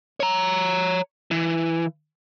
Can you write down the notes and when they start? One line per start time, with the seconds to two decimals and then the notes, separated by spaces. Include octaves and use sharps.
0.20 C#5 A#5
1.31 E3